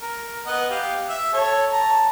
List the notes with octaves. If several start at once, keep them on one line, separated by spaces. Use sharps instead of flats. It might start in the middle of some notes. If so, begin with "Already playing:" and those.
A#4
B3 D#5 F#5
G4 F5
E5
A4 C#5
A5 A#5